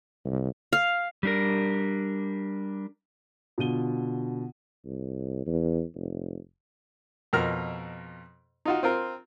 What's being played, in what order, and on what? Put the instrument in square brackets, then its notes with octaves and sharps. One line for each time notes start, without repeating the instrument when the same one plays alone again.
[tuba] C2
[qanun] F5
[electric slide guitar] G3 D4 A#4
[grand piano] B2 D3 F4 D#7 G7
[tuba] C2
E2
F1
[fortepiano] F2 B2 A#4 A#5 F6
D#4 F4 F#4
C4 F4 A#4